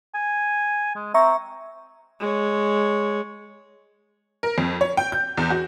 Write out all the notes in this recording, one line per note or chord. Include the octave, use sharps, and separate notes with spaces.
G#5
G#3
C4 E5 A#5 C#6
G#3 C#5
A#4
F2
C#5
G5
G6
E2
F#4